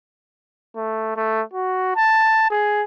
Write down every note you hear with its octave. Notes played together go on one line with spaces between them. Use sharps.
A3
A3
F#4
A5
G#4